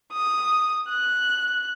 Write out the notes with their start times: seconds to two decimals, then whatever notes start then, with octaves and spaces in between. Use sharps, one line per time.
0.13 D#6
0.89 F#6